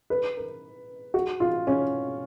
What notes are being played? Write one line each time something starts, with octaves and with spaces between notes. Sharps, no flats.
B4
A#4
F#4
F4
C#4